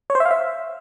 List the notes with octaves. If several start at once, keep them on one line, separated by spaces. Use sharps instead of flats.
C#5
C5
E5
F5
E5